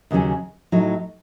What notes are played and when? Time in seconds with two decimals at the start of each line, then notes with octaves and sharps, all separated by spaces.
0.11 D#2 C#3 F#3 C#4 G#4
0.72 A2 F#3 A3 D#4